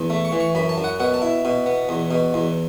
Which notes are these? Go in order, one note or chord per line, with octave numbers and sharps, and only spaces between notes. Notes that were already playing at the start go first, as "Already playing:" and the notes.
Already playing: E2
A3
C#6
E3
C#6
F#2 B5
A5
F#2
F#5
B2 F#5
A5
E4
B2
B3
E2
B2
E2